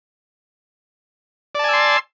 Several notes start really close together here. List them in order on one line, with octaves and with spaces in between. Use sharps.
D5 A5 G#5 E6 C6